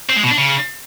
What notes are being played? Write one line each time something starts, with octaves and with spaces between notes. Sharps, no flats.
C4
G#3
B2
D4
C#3